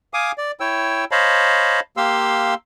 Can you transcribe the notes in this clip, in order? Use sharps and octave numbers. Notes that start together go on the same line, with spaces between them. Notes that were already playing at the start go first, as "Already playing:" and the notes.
F5 G#5 D6 D#6
D5
E4 C#5 G5 E6
C5 C#5 D#5 F5 A5 B5
A#3 G4 F5 C6 E6